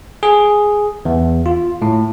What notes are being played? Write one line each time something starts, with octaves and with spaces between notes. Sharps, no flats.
G#4
E2
F4
A2